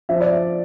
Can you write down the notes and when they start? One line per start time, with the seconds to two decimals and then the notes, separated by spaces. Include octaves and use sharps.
0.09 F3 E5
0.20 D5
0.32 E5